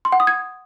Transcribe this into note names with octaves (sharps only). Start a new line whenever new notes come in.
C6
F#5
D#6
G#6